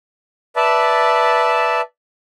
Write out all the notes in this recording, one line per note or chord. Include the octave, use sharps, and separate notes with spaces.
B4 D5 E5 A5